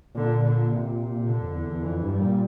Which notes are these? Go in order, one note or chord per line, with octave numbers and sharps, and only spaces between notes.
A#2 D3
D3
C3
D3
F2
E2
E2
F2 E3
G2
G3
A#2